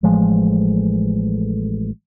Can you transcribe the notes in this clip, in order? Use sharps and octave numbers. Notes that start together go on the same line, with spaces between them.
A1 F3 G#3 A3